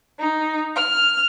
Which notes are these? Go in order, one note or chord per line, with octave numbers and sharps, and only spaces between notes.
D#4
F6